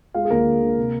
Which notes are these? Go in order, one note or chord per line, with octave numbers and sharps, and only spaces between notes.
G#3 F4 F5
G#4
D2 A#3 A#4
D3
D3
C3